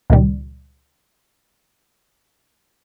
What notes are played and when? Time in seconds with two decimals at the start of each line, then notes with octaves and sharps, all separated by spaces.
0.10 C#2 A#2 D#3 G3